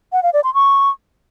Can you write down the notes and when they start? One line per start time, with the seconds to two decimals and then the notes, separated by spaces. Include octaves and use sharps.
0.13 F#5
0.23 F5
0.33 D5
0.44 C6
0.54 C#6